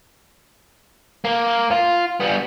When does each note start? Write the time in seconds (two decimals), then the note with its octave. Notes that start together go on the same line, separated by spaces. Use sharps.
1.25 A#3
1.71 F4
2.20 G3 B3